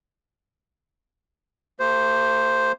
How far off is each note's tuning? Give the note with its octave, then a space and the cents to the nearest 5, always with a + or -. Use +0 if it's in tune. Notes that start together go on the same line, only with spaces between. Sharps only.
A3 +45 G4 +0 C5 +0